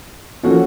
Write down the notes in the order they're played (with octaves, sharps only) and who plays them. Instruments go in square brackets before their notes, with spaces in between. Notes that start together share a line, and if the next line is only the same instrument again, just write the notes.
[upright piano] F3 A#3 C#4 F#4 A4